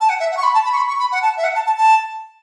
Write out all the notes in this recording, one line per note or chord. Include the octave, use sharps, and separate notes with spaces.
A5
F#5
E5
F#5
C#6
B5
A5
B5
C#6
B5
C#6
B5
F#5
A5
E5
F#5
A5
A5
A5